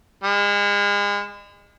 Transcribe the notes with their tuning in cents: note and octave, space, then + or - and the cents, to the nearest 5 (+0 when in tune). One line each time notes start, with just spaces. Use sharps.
G#3 -35